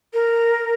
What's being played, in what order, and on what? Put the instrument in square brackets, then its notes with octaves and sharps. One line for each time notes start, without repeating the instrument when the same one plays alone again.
[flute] A#4